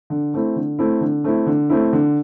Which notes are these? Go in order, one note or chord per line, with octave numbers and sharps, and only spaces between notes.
D3
A3 C4 E4
D3
A3 C4 E4
D3
A3 C4 E4
D3
A3 C4 E4
D3